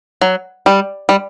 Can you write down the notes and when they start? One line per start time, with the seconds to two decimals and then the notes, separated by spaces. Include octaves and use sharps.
0.21 F#3
0.66 G3
1.09 G3